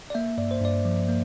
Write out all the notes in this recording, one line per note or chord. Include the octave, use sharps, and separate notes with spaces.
D5
A#3 E5
G2 D5
C5
G2 D5
F3
A#3